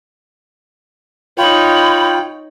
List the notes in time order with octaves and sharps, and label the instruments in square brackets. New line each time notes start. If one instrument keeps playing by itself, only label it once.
[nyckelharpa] D#4 C#5 [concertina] F4 G5 [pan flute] B5